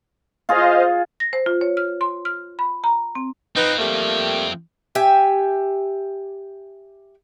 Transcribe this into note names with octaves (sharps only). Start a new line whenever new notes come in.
F4 G#4 C5 D#5 F5
A#6
C5
F4
C#5
F6
C6
F6
B5
A#5
C4
F3 C4 D#4 B4
G3 A3 A#3
G4 E5 G#5